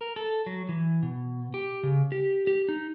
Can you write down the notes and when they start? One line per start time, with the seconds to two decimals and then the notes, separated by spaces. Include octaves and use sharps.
0.01 A#4
0.16 A4
0.46 F#3
0.69 E3
1.03 B2
1.54 G4
1.83 C#3
2.12 G4
2.47 G4
2.69 D#4